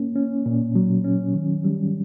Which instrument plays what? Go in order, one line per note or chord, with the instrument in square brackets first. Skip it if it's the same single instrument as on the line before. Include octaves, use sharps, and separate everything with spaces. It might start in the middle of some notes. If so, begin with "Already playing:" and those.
Already playing: [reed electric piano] A#3 C#4
C#4
A#2
F#3
C#4
D#3
G3